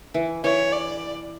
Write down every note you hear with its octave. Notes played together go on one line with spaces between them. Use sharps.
E3
E3 C#5
D5